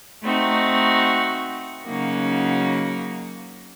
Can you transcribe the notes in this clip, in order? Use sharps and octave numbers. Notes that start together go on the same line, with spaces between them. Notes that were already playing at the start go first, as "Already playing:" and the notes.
A3 C4 D#4 F#4
C#3 F#3 A#3 D#4 F#4